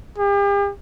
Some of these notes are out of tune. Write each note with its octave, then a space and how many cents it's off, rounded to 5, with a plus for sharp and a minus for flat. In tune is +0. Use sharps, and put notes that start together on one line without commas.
G4 +45